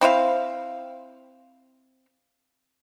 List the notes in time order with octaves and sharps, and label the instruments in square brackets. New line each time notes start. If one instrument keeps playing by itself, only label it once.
[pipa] C4 E4 C5 F5